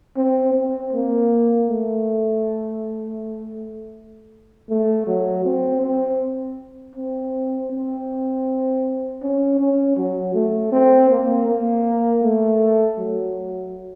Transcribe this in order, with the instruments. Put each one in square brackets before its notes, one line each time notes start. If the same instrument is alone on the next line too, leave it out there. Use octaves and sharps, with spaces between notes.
[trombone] C4
C4
A#3
A3
A3
F#3
C4
C4
C4
C4
C#4
C#4
F#3
A3
C4
A#3
A#3
A3
F#3